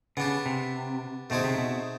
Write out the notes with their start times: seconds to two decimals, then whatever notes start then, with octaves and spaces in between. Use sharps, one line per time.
0.17 C#3 B3 D4 G4
0.46 C3
1.30 B2 A3 C4 D#4 G#4 C5
1.44 C3
1.58 B2